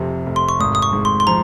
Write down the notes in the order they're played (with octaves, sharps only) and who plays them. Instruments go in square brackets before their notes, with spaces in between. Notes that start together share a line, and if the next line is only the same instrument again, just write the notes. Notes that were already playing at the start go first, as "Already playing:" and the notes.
Already playing: [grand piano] F1 F2 C3
F1
[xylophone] C6
C#6
[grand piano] G#1 [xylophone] D#6
[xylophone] D#6
C#6
[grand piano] G#2
[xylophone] C6
C6
[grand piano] F3 [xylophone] A#5